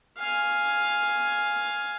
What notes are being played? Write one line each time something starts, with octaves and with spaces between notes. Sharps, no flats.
F5 G#5